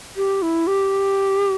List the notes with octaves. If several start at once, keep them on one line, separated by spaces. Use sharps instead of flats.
G4
E4
G4